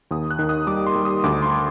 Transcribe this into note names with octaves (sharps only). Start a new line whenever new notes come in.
D#2 D#6
F#6
D#3
D#6
G3 D6
C6
G3
D#6
D2 D6
C6